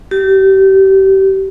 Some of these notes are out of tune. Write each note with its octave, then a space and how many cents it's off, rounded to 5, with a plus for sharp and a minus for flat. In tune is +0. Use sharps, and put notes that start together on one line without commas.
G4 -30